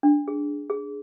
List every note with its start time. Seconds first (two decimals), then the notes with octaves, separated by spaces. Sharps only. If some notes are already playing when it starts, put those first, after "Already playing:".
0.03 D4
0.28 G#4
0.70 G#4